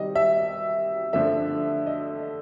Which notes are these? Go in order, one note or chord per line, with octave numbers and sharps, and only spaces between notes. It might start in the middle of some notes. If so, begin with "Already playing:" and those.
Already playing: C3 D#3 G3 D#5
E5
D3 F3 A3 E5
D#5